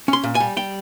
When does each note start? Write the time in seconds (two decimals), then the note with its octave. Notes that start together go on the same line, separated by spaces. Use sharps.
0.08 C#4 C6
0.24 A#2
0.35 G#5
0.40 G3
0.57 G3 G5